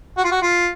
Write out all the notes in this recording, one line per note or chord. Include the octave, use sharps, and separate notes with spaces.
F#4
F4
F#4
F4